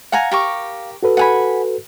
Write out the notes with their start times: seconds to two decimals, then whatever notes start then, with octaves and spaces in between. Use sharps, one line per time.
0.12 F5 F#5 G#5 A#5
0.31 G4 A#4 C#6
1.03 F#4 A4 B4
1.17 F#5 G#5 B5